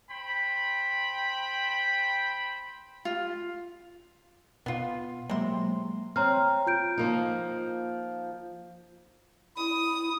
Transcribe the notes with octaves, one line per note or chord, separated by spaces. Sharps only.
C5 G5 B5
F4
B2 B3 F4
C3 F#3 G#3 A#3 C6
C4 C#5 A#5 F6
F4 G6 D7
F3 A#3 D#4
E4 D#6